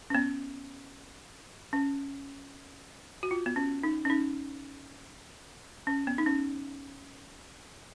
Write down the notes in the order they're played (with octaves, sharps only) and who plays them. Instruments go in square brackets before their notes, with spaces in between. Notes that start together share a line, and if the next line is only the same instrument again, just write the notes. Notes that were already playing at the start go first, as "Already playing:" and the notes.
[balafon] C#4
B3
C#4
F#4
F4
B3
C#4
D#4
C#4
D#4
C#4
B3
D#4
C#4